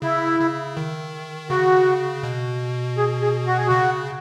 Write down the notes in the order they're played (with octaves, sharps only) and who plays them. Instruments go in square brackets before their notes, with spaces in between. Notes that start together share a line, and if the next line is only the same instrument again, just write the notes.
[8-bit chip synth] C#3 [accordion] E4
[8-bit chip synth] C#3
D#3
[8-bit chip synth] C#3 [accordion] F#4
[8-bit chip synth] B2
[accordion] G#4
G#4
F#4
G#4
[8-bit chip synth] C#3 [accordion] F#4